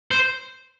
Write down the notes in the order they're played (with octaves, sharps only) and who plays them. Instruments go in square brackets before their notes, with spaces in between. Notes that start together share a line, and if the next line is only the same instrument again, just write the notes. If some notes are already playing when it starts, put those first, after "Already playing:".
[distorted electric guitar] C5